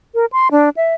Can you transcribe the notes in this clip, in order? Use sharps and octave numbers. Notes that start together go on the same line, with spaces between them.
A#4
C6
D4
E5